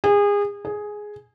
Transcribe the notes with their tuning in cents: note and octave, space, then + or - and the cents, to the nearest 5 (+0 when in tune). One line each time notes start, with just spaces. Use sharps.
G#4 -30
G#4 +5